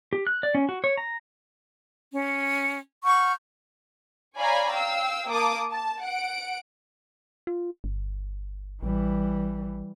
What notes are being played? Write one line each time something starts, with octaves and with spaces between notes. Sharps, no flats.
G4
F#6
D5
C#4
F#4
C#5
A#5
C#4
F#5 C#6 F6 G6
C#5 D5 F5 G#5 A#5 B5
F5 G5 E6
A#3 A5 D6 D#6
A5
F#5 D7
F4
G1
A1 E3 G3